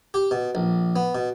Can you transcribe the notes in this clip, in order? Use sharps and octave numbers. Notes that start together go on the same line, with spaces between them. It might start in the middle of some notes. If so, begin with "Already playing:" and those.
G4
B2
A#1
B3
B2